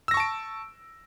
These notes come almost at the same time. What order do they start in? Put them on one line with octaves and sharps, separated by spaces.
E6 A#6 C#6 A5 D7